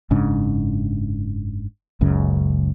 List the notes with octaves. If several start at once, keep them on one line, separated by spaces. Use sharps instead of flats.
F#1 G#2 C#3 D4
F#1 C#2 F#2 C#3